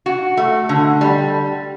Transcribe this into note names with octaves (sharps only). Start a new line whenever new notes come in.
F#4
A3
D3
G3